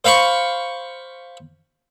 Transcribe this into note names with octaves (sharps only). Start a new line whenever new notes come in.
C5 F5 B5 C#6